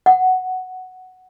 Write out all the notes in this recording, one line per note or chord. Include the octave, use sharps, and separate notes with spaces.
F#5